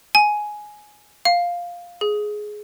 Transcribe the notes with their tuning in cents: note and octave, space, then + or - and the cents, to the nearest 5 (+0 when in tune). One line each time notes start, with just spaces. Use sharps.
G#5 +10
F5 +5
G#4 +10